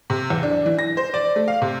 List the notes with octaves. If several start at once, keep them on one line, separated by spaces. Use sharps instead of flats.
C3
E2
D4
E3
A#6
C5
D5
A3
F5
C3